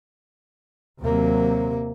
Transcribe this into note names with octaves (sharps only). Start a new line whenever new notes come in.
D#2 C3 F#3 A#3 C4